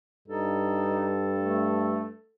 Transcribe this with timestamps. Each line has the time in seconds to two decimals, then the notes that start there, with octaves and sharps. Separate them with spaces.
0.28 G2 D#4 A4
1.37 A3